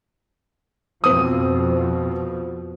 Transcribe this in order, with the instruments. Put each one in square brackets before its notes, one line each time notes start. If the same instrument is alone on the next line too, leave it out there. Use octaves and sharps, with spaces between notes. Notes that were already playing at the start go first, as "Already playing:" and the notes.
[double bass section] F2 B2 F3 [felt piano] C4 D#6